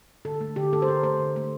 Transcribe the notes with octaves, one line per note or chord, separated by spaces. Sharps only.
D3 A4
A3
D3 G4
A3 A4
C5
D3 A#4
A3 C5
D3
A3